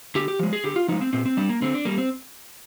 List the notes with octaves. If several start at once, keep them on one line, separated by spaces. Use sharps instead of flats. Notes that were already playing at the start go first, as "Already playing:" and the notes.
D3 G4
G4
F3 G#3
G#4
D3 G4
F4
F3 G#3 D#4
C4
A#2 C4
C4
G3 D4
A#3
D3 C4
D4
G3 A#3
C4